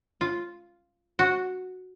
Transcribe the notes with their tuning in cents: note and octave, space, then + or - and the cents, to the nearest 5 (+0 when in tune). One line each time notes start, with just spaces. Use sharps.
F4 -5
F#4 -5